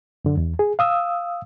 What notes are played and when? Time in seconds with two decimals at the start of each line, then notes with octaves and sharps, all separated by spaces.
0.25 F#2 D3
0.37 E2
0.59 G#4
0.79 F5 D#6 E6